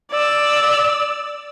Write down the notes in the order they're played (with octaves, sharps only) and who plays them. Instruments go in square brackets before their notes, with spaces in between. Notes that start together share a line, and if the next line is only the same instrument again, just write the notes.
[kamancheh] D5 E6